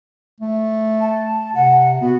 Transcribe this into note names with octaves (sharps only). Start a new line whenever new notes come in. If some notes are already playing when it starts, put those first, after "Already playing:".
A3
A5
C3 F#5
B3 F#4